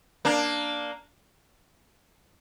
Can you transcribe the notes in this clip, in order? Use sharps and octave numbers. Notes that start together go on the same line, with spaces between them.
A#3 D4